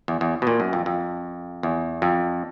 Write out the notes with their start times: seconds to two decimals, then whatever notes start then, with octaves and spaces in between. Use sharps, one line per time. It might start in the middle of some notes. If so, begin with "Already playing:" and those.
0.08 E2
0.21 E2
0.42 B2
0.47 A#2
0.60 F#2
0.73 F2
0.86 F2
1.63 E2
2.02 F2